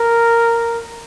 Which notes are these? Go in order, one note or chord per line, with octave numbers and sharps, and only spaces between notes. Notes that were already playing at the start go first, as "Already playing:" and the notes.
Already playing: A#4